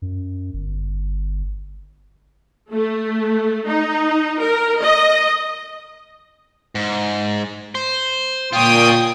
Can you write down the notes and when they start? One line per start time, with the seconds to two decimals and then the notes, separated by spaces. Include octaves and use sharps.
0.02 F#2
0.54 G1
2.73 A3
3.66 D#4
4.41 A#4
4.83 D#5
6.75 G#2
7.75 C5
8.53 A#2 F4 C#5 G5 D#6